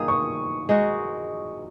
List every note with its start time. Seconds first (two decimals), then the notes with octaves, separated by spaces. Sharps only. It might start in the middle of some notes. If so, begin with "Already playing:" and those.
Already playing: D#3 A#3 F4 G#4 D#6
0.08 C#6
0.69 G#3 D#4 F#4